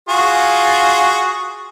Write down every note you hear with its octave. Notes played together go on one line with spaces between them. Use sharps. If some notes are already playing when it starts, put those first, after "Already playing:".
F4 F#4 G#4